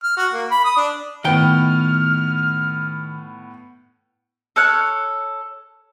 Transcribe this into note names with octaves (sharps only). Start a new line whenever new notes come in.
F6
F#4
A#3
B5
D#6
D4
A2 D#3 B3 G5 F6
A4 C#5 F6 F#6